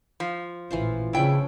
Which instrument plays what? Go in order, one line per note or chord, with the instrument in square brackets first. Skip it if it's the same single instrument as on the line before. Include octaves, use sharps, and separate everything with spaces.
[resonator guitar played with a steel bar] F3
[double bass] A1 A#2 [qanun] E3 F4 C5
[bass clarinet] C#3 [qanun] F3 D4 B4 [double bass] C#4 [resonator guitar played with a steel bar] E4 G5